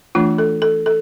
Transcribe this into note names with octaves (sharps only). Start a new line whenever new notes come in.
E3 A3 D4 F4
A4
A4
A4